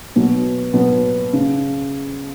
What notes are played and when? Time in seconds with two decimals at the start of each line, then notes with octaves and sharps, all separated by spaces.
0.16 B2 F#3 B3
0.74 B2 F#3 B3
1.33 C#3